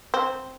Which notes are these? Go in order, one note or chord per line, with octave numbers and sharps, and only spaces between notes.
C4